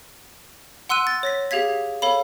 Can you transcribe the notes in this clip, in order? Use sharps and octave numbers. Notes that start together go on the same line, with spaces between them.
F#5 C6 E6 F#6 D#7
A6
C#5 A#6 B6
G4 G#4 F5 G#6 B6
A4 C#5 F5 B5